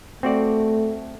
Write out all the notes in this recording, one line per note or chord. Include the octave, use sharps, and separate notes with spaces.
A3 C4 F#4 D5